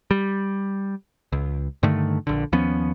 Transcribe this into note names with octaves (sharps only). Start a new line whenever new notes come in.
G3
C#2
G2 D3 D#3 A3
A#1 D3
D#2 F3 B3 C#4